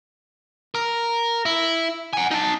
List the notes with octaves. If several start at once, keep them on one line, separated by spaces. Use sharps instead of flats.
A#4
E4
F#5 G#5
D#4 A5